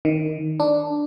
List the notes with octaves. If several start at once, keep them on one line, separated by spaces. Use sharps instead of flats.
D#3
D4